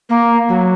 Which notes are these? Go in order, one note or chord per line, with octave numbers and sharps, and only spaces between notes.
A#3
F#3